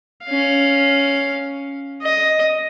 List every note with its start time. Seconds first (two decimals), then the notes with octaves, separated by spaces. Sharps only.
0.25 C#4 F5
2.03 D#5